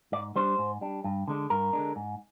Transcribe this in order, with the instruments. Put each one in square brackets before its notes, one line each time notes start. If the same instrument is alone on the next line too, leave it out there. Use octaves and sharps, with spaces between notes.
[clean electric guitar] G#2 D5
G3 D4 C5
G#2
G3 D4
G2
D3 G#3 D4
G2 A#4
D3 G#3 D4
G#2